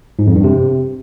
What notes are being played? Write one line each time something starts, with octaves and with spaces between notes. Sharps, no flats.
G#2
F2
G2
C3